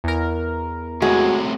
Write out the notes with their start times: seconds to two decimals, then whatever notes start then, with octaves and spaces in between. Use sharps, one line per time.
0.04 E2 A#4
1.02 A2 C3 G#3 F#4